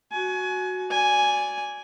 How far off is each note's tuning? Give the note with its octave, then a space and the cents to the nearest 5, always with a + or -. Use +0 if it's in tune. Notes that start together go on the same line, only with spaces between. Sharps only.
F#4 +0 G#5 +30
D5 -20 G#5 +0